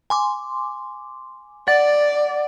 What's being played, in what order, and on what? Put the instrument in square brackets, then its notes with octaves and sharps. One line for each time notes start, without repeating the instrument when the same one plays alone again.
[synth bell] G#5 C6 D6
[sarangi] D5 [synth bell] F#5 A6